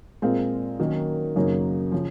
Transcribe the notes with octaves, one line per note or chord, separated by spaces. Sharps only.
A#2 G#3 C4 F4 A#4
D#3 F#3 A#3 C#4
F#2 C#3 F#3 A#3 D#4
C#3 F3